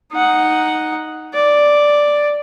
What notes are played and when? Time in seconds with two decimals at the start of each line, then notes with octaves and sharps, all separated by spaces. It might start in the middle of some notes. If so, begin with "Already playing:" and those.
0.13 D#4 F#5
1.34 D5